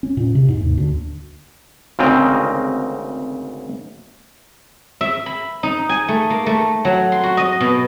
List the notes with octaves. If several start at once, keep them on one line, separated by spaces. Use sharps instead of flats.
C#4
A#2
C3
G#2
D#2
D2
G#1 D2 C#3 C4 A#4 D#5
E5
B5
D#4
G#5
A3
A#3
A3
F#3
C6
F#4
D#5
B2